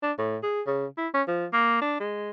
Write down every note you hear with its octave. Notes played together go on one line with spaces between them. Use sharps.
D4
A2
G#4
C#3
E4
C#4
F3
A#3
D4
G#3